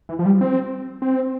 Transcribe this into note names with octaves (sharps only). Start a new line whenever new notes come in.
E3
F3
G3
C4
C4